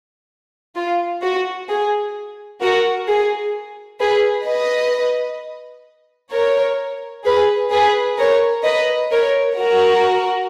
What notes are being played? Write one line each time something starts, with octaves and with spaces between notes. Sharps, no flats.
F4
F#4
G#4
F#4 A#4
G#4
G#4 B4
B4 D#5
A#4 C#5
G#4 B4
G#4 B4
A#4 C#5
B4 D#5
A#4 C#5
F#4 A#4